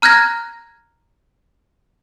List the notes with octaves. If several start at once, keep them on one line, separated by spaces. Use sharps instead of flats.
A#5 F6 F#6 G#6 A#6